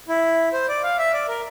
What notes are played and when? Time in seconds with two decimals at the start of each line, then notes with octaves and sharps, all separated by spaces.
0.09 E4
0.53 C5
0.69 D5
0.83 F5
0.98 E5
1.13 D5
1.28 A#4